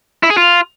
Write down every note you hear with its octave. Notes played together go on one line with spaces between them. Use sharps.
E4
G#4
F4